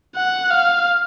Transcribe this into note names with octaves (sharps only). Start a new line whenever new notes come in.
F#5
F5